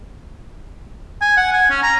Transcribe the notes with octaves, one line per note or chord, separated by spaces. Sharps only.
G#5
F#5
G#5
C#4
A#5